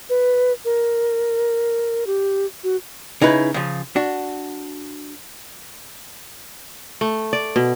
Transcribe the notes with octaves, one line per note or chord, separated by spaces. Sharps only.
B4
A#4
G4
F#4
C#3 D#4 E4 B4
C#3 F3
D4 F#4
A3
D5
B2